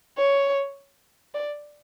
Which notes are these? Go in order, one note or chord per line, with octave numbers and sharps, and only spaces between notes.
C#5
D5